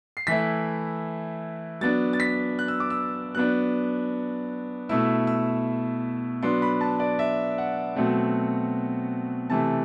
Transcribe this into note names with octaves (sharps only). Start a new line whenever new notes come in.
C7
E3 A3 E4 B6
F#3 B3 D4 A6
A6
B6
F#6
E6
D6
E6
F#3 B3 D4 F#6
B2 A3 E4 E6
E6
F#3 B3 D4 C6
B5
A5
D5
E5
F#5
B2 F#3 A3 C4
C3 E3 A3 A5